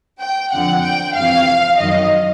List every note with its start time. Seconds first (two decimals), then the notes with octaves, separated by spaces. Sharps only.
0.21 G5
0.53 F2 D3 F3 F#5
0.85 G5
1.16 F2 C3 E3 F5
1.79 F#2 D#3 F#3 D#5